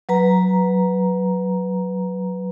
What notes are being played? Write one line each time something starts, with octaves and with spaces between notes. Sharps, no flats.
F#3 B4 A#5